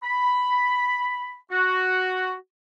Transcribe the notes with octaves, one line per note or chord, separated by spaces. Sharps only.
B5
F#4